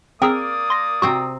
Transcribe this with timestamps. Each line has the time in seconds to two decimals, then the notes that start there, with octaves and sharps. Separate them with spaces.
0.22 A#3 C4 G#4 A#4 D5 D#6 E6
0.70 C6 A#6
1.02 C3 C4 F#4 A#5